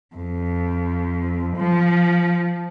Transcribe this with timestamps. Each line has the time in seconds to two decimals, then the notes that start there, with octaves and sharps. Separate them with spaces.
0.16 F2
1.57 F3